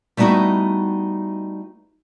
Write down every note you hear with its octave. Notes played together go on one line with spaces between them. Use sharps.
G3 A3 B3 D#4 E4 F#4